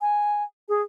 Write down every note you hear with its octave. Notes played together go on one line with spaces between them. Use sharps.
G#5
G#4